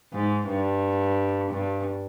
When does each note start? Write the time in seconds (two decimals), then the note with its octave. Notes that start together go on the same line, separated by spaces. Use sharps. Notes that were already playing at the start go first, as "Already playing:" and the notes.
0.13 G#2
0.48 G2
1.52 G2